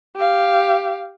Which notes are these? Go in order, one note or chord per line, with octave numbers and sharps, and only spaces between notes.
G4 F5